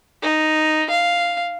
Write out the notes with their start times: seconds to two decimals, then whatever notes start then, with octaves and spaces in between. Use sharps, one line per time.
0.23 D#4
0.90 F5